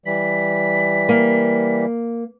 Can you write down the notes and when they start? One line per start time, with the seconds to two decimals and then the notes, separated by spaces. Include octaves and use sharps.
0.06 E3 G3 B6
1.09 A#3